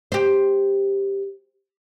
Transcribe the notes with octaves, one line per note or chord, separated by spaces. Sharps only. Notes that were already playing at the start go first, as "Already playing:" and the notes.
G4 C5